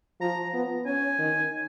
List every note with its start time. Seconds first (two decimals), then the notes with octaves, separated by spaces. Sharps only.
0.21 F3 A#5
0.54 B3
0.86 C#4 G#5
1.19 D#3